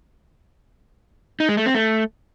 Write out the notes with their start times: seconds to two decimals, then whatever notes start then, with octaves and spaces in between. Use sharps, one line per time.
1.40 D#4
1.49 G#3
1.57 A3
1.66 C4
1.75 A3